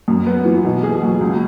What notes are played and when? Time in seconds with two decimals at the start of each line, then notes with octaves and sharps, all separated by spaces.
0.08 F#2
0.27 B3
0.45 E3
0.64 B2
0.83 G#4
1.03 F#3
1.21 C#2